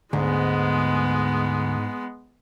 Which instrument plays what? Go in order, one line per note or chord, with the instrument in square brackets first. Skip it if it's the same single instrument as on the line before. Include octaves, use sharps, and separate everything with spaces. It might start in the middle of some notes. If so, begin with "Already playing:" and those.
[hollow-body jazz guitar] D2 [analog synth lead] G#2 [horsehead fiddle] G#3 B3